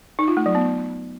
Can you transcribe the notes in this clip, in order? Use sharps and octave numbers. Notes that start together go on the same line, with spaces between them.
D#4
F4
A3
F#3
B3